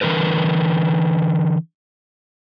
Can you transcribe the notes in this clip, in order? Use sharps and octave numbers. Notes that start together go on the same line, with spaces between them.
D3 E3 F4 A#4 B4